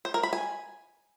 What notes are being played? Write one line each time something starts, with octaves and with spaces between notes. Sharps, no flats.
C5
A#4
B5
G#5